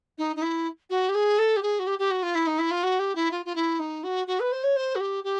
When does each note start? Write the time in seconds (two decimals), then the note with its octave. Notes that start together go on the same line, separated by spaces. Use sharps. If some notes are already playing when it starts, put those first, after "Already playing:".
0.18 D#4
0.36 D#4
0.42 E4
0.90 F#4
1.08 G4
1.14 G#4
1.38 A4
1.56 G4
1.62 G#4
1.79 F#4
1.86 G4
1.99 G4
2.10 F#4
2.22 F4
2.35 E4
2.47 D#4
2.58 E4
2.70 F4
2.83 F#4
2.99 G4
3.15 E4
3.31 F4
3.45 F4
3.55 E4
3.79 D#4
4.03 F#4
4.27 F#4
4.40 B4
4.52 C5
4.63 C#5
4.76 C5
4.95 F#4
5.00 G4
5.24 G4